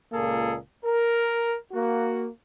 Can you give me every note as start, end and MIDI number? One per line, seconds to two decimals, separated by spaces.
0.13 0.57 37
0.13 0.57 46
0.13 0.57 58
0.13 0.57 68
0.13 0.57 69
0.85 1.55 70
1.72 2.26 58
1.72 2.26 66